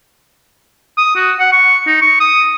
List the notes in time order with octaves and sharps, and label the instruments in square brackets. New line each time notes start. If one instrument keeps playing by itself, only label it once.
[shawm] D#6
F#4
F#5
C#6
D#4
C#6
D#6